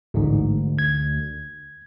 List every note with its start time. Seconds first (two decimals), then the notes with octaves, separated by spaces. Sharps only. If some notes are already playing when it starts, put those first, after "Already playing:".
0.14 A1 D2 G#2
0.79 G#6